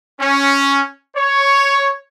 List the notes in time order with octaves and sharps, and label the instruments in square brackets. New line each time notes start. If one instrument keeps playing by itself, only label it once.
[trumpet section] C#4
C#5